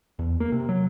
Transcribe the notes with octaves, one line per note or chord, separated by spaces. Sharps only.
E2
A#3
C3
F#3